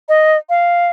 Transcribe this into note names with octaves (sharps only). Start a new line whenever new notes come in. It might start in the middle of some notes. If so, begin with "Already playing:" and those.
D#5
F5